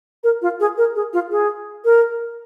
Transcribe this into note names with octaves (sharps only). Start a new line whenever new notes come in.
A#4
F4
G#4
A#4
G#4
F4
G#4
A#4